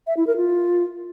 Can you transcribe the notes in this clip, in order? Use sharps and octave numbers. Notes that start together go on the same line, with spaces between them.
E5
E4
A#4
F4